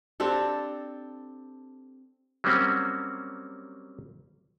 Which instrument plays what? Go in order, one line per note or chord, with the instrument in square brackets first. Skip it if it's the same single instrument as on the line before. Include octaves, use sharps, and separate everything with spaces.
[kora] C4 D4 G4 A4
[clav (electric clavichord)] F#3 G3 A#3 C4 C#4 F#4